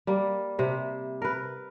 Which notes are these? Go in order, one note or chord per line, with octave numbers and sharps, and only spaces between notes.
G3 A#3
C3 C5 E5
A#4 B4